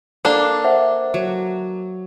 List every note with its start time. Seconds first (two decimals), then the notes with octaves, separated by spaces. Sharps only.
0.25 A#3 D4 A4 A#5 C6
0.64 C5 E5 F#5
1.14 F#3